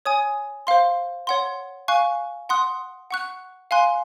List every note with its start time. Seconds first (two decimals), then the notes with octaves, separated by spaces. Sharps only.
0.05 C#5 G#5 D#6
0.67 C5 F5 C6
1.27 C#5 F#5 C6
1.88 F5 G#5 C#6 F#6
2.49 F#5 C6 D#6 F#6
3.11 F#5 C#6 F#6
3.71 F5 G#5 C6 F#6